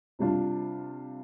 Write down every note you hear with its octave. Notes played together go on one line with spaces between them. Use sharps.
C3 G3 D4 F4